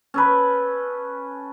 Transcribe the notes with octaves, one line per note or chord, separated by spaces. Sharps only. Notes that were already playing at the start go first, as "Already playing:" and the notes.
C#4 A4 B4